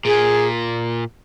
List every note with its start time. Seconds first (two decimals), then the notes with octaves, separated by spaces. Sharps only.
0.05 A#2 G#4